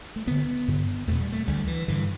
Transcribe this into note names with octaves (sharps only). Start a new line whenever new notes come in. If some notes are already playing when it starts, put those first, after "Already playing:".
A3
D2 D3 B3
G2 D3
E2 B2 A3
G3
A3
D2 D3 G3
E3
G2 D3 E3